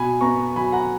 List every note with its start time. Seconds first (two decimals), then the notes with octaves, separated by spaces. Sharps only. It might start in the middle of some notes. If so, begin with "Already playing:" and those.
Already playing: B2 G#5 B5
0.21 B3 A#5 C#6
0.56 F#3 G#5 B5
0.72 F#5 A#5